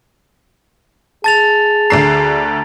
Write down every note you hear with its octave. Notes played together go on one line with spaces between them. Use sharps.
G#4 A5 A6 F7
D2 D3 A#5 C7